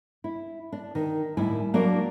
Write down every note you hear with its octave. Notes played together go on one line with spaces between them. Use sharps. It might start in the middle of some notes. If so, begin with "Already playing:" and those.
E4
D4
D#3
D#2 A2 G3 E4 G#5
F#3 A#3 D4 F#4 A#4 D5